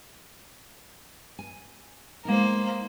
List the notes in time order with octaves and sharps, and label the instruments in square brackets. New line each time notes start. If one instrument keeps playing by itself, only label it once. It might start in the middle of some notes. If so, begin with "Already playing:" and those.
[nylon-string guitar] G#5
[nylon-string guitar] G#3 B3 D#4 [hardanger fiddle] A#3 C5